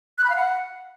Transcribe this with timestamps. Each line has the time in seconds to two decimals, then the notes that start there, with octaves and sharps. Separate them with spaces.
0.18 F#6
0.24 B5
0.30 F5
0.36 F#5